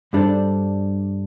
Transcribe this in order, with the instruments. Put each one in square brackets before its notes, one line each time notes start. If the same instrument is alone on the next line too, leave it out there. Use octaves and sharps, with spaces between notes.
[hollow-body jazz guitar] G2 G3 D4 A4 C5